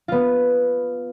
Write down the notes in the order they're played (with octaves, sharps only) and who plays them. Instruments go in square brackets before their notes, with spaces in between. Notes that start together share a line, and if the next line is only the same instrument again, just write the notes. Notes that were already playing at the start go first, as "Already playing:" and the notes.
[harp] B3 F4